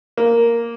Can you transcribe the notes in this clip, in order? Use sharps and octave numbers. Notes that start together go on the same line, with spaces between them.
A#3